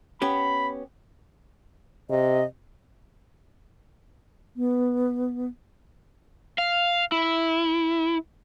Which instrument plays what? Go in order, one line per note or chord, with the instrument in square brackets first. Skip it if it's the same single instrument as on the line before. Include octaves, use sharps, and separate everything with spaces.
[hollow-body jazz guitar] B3 C#4 G4 [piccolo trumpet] B5
[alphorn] C3 [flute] D#5
[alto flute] B3
[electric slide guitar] F5
E4